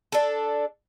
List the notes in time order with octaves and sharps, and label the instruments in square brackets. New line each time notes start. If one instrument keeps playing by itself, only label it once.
[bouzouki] D4 A4